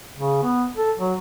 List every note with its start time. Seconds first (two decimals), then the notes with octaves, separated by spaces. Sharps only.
0.17 C#3
0.43 B3
0.77 A4
1.00 F#3